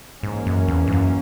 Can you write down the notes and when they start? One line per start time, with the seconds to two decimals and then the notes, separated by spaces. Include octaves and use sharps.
0.22 G#2 E3 A#3 C#4
0.47 F#2
0.68 E2
0.87 G#2
0.92 F#2